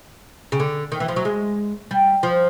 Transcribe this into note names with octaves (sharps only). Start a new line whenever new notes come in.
C#3
D3
D#3
E3
F3
F#3
G#3
G3
F3